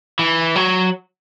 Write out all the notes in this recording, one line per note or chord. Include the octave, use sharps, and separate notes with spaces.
E3
F#3